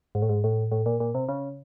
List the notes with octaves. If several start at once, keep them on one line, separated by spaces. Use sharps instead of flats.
G#2
A2
G#2
A2
A2
A#2
A#2
C3
C#3